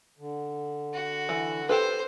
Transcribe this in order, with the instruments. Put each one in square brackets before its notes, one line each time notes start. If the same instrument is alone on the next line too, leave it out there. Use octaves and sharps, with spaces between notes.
[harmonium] D3
[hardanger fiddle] F#4
[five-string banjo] E3
[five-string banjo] G4 A4 B4 [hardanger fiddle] C5